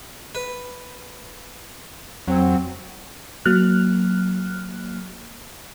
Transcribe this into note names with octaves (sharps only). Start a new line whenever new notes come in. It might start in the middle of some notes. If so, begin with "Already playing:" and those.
B4
F2 F#3 C4
F#3 A#3 F6 F#6